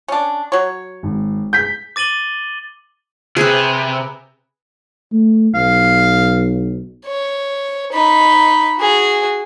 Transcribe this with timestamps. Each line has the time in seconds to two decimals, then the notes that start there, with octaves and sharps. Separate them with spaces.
0.08 C#4 D4
0.52 F#3 C#5
1.03 G#1
1.53 G6 B6
1.96 D6 A6 D#7 F#7 G7
3.37 C3 G#4 B4
5.12 A3
5.54 B1 F5
7.06 C#5
7.92 D#4 B5
8.78 F#4 G#4